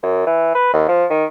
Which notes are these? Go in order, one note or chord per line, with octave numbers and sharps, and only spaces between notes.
F#2
E3
B4
D#2
F3
D#3